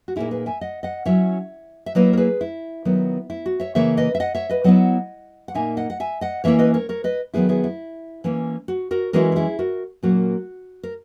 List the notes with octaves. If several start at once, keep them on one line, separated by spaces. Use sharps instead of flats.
F#4
A#2 A#3 D#4 E4 G#4
G#4 B4
E5 G#5
D#5 F#5
D#5 F#5
F#3 C#4 E4 C#5 E5
E5
F#3 A#3 E4 B4 D#5
A#4
G#4 B4
E4
D#3 F#3 B3
E4
F#4
C#5 E5
C#3 E3 A#3 C#5 E5
B4 D#5
E5
D#5 F#5
C#5 E5
B4 D#5
F#3 B3 E4 D#5 F#5
F#5
A#2 A#3 D#4 E5 G#5
D#5 F#5
F#5
E5 G#5
D#5 F#5
E3 A#3 C#4 E4 C#5 E5
B4 D#5
A#4 C#5
A#4 C#5
B4 D#5
D#3 F#3 B3 E4 G#4 B4
E4 G#4
E4
E3 A#3 C#4 E4
F#4
F#4 A#4
E3 G#3 C#4 E4 F#4 A#4
A#4
E4 G#4
F#4 A#4
A#2 F#3 A#3 C#4 F#4
A#4